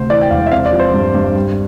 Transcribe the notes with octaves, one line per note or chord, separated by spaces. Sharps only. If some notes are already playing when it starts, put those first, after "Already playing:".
Already playing: D2 C3 C5
E3 D5
G5
E1 F5
E5
C4 F5
D5
F3
C5
G2
G2
G3